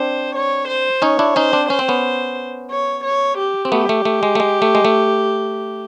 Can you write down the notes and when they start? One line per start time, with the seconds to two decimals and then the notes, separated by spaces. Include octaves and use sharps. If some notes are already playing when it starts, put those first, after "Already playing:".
Already playing: C4 D4 C5
0.36 C#5
0.68 C5
1.02 C#4 D#4 C#5
1.19 D4 E4
1.36 C#4 D#4 C5
1.53 C4 D4
1.69 C#4 C5
1.79 C4
1.88 B3 C#4
2.71 C#5
3.04 C#5
3.38 G4
3.65 C4
3.72 A3 B3 G4
3.89 A3
4.05 A3
4.23 G#3
4.35 A3
4.40 G#3
4.62 A3
4.75 G#3
4.85 A3